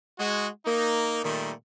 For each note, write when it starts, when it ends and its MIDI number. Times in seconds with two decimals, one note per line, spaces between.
0.19 0.47 56
0.19 0.47 66
0.65 1.21 58
0.65 1.21 63
1.23 1.52 46
1.23 1.52 51
1.23 1.52 55
1.23 1.52 57